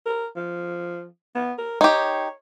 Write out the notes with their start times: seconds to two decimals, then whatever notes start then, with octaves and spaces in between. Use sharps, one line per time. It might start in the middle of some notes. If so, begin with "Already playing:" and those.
0.06 A#4
0.36 F3
1.35 B3
1.58 A#4
1.81 D#4 G4 C#5